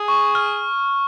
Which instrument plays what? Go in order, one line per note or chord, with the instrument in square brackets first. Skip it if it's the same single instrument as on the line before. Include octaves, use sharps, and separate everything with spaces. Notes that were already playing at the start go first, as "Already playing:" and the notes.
Already playing: [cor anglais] G#4
[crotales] C#6
F6